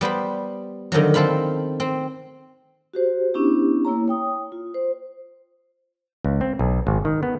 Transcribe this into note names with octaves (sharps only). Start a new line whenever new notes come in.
G3 B3 C5 B5
D3 D#3 F3 F#3
C4 A4 C5 F5 B5
C4
F#4 G4 C5
B3 C#4 D4 E4 G4
A#3 E4 C#5 A#5
C#5 G5 D#6
F4
C5
C#2
C4
B1
G#1
D#3
B3